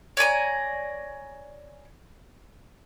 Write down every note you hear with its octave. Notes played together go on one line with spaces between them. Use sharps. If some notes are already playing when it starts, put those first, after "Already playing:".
C#5 D5 G#5 A#5